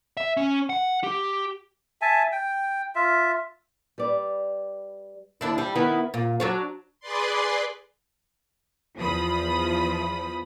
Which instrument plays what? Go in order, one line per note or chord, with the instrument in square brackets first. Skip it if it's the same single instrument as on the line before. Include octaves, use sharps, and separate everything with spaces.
[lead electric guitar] E5
C#4
F#5
G4
[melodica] E5 G#5 A5
G5
F4 E5
[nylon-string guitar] G3 B4 D5
[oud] D#2 D4 E4
G3
D#3 B3 E4
A#2
F#3 D4 C#5
[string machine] G#4 B4 D5 C6
[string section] E2 F3 B5 D#6